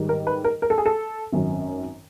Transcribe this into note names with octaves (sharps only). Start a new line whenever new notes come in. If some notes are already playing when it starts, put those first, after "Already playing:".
Already playing: G#2 D#3 G3
A#4
B4
A#4
A#4
A4
G#4
A4
G#1 F#2 D#3 F#3